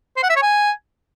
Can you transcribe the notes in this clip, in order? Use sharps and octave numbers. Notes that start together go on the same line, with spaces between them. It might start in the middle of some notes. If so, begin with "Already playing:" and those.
C5
F#5
E5
C#5
G#5